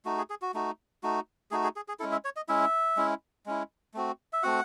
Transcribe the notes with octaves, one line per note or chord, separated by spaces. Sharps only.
A3 D#4 F#4
G#4
G#4
F#4
A3 D#4 F#4
A3 D#4 F#4
A3 D#4 F#4 G#4
G#4
G#4
G#4
G#3 C#4 E4 A4
E5
C#5
D#5
G#3 C#4 E4 E5
G#3 C#4 E4
G#3 C#4 E4
A3 C4 F#4
E5
A3 C4 F#4 F#5